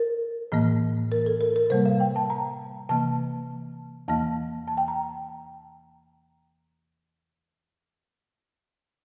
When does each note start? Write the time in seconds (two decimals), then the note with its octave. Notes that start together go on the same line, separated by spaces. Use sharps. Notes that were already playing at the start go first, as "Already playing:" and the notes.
Already playing: A#4
0.52 A2 E3 A#3
1.12 A#4
1.26 A4
1.41 A#4
1.56 A#4
1.70 C3 G3 A#3 C5
1.86 F5
2.00 G5
2.16 A5
2.30 A#5
2.89 C3 E3 A#3 A5
4.08 E2 E3 A#3 A5
4.68 A5
4.77 G5
4.88 A#5